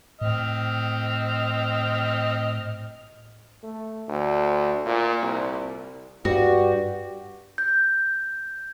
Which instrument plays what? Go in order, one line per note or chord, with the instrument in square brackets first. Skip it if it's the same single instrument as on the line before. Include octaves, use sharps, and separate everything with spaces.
[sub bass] A2 [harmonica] C4 D#5 F6
[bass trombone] A3
D2
A#2
C2
[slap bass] G2 [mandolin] F#4 [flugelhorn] G4
[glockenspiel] G6